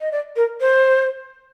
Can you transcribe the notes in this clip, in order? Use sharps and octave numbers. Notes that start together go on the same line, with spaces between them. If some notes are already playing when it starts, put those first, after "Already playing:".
D#5
D5
A#4
C5